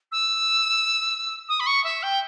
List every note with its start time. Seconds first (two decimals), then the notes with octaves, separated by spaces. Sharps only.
0.11 E6
1.48 D#6
1.60 B5
1.66 C#6
1.84 E5
2.02 G5